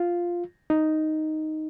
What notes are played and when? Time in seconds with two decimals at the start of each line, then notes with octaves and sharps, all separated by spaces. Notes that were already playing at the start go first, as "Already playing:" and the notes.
Already playing: F4
0.70 D#4